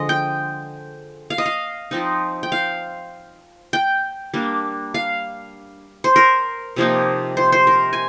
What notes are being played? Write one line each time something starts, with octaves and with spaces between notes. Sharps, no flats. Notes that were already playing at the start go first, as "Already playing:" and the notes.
Already playing: D3 F3 G#3 D#5
G5
F5
D#5
F5
F3 C4 D#4
G5
F5
G5
G3 A#3 D4
F5
C5
A#4
C3 F3 A#3 D#4
C5
C5
A#4
G#5